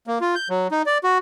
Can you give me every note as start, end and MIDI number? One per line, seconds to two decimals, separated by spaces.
0.07 0.19 58
0.21 0.35 65
0.35 0.48 91
0.50 0.68 54
0.71 0.82 63
0.86 0.98 74
1.04 1.18 66